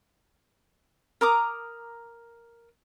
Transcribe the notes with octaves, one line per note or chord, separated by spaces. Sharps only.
A#4 A#5 D6 D#6